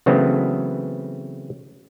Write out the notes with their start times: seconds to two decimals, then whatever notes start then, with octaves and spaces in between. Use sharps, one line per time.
0.06 C#3 E3 F#3 A3 B3 C4